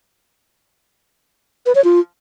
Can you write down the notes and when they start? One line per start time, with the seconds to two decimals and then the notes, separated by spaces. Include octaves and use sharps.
1.66 B4
1.75 C#5
1.84 F4